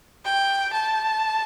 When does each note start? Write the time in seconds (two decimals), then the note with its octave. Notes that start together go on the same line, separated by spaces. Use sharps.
0.25 G5
0.73 A5